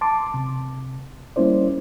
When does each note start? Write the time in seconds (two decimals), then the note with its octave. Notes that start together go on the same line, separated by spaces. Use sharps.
0.01 A5 C6 D6
0.34 C3
1.36 G3 A#3 C#4 E4 C5 D5